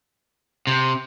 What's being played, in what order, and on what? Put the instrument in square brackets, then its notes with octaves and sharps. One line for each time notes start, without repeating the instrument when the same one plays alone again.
[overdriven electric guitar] C3